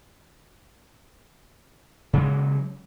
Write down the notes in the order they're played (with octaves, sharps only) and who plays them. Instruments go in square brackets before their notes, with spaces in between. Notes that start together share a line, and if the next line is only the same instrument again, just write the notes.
[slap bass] C#3 F#3 G#3